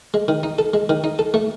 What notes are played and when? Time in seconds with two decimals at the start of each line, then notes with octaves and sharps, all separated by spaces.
0.14 G#3
0.28 D#3
0.43 D#4
0.59 A4
0.74 G#3
0.89 D#3
1.04 D#4
1.19 A4
1.34 A3